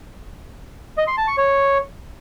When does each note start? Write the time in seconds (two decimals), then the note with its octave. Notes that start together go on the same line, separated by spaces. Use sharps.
0.98 D#5
1.08 C6
1.18 A5
1.27 C#6
1.37 C#5